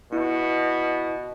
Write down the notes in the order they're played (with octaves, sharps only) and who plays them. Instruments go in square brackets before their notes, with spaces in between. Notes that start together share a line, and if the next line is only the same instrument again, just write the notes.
[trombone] B2 [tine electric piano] E4